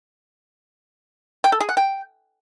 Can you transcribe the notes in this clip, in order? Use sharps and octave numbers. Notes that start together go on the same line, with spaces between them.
G5
A4
G#4
F#5
G5